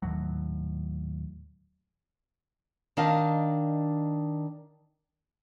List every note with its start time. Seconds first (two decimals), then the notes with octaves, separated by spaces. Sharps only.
0.02 D#1 D#2 A2 F#3
2.97 D#3 D4 D#5 F5 A5